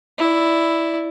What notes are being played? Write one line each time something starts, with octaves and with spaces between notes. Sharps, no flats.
E4 D5